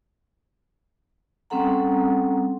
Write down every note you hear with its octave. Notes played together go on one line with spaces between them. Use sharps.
G3 C4 C#4 A4 F#5 A#5